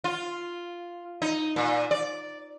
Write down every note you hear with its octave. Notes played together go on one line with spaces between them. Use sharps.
F4
D#4
A#2
D5